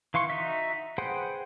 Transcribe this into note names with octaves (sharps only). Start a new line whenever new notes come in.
E3 F5 C6 C#6
D#4 F#4 E5
G#4 B4 C5 F#5 G5